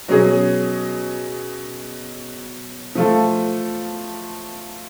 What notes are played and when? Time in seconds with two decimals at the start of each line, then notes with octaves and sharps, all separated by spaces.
0.08 B2 F#3 C#4 G#4
2.95 F3 A3 F4 A4